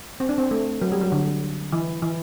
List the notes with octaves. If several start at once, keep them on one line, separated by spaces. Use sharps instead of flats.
C4
D4
C4
A3
F#3
G3
F#3
D3
E3
E3